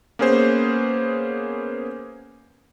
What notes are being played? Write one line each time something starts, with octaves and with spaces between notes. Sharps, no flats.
A#3 B3 C#4 G#4 C5